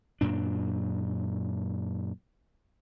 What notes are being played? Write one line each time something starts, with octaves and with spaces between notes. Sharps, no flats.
F#2 A#2 D4